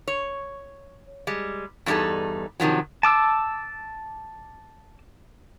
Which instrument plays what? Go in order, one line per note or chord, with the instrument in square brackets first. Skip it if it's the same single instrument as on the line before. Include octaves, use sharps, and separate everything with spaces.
[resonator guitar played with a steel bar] C#5
G3 G#3
E2 G2 G3 D#4 G#4 A4
C3 D#3 F3 F#3
[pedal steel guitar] A5 D6 E6